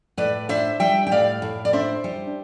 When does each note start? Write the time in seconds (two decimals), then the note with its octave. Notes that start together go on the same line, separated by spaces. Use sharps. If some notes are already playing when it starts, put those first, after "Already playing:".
0.17 A2 B4 D5
0.49 D4 C5 E5
0.80 G3 E5 G5
1.07 G5
1.11 A2 D5 F5
1.42 A2
1.65 D5
1.73 D4 C5 E5
2.04 G3